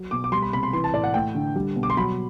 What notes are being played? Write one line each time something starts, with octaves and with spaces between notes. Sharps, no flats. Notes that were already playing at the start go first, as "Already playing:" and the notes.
Already playing: F#3
B2 D6
D6
G3 C6
B5
C3 B5
C6
E3 C6
A5
A2 D5
F#5
A3 G5
D3
G3
B2
D6
C6
F#3 B5